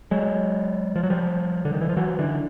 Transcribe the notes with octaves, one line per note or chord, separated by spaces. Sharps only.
F#3 G#3
F3
F#3
F3 G3
D3
D#3
E3
F3
E3 F#3
D3 E3